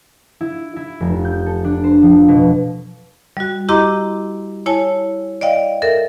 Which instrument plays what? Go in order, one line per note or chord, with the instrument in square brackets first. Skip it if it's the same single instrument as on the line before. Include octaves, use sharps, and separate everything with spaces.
[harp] E4
E4
F1
G6
A4
D4
C5
F3
B2
[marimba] G3 F#4
E4 G4 D#5 A#5 C6 D6
E4 C#5 G#5 A5
D5 D#5 F5 G5
A4 A#4 E5